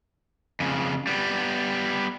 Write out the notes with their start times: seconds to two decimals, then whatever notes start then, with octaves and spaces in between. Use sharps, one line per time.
0.60 F2 C#3
1.07 G3 B3